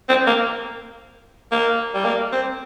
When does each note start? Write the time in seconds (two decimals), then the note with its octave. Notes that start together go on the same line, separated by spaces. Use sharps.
0.09 C4
0.27 A#3
1.52 A#3
1.94 G3
2.05 A#3
2.32 C4